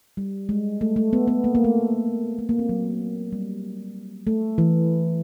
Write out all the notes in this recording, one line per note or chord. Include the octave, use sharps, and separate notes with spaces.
G3
G#3
A3
A3
B3
B3
A#3
A#3
A3
A3
A#3
C4
F#3
G3
A3
E3